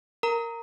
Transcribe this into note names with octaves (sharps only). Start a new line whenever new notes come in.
A#4 A#5